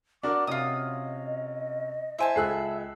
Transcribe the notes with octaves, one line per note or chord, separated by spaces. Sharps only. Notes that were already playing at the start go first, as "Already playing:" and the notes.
D4 F#4 A#4 D6
C3 C#4 F4 F#4 D#5 D#6
E4 C5 E5 G#5 A5
C#2 G#4 A4 E6 F#6 C7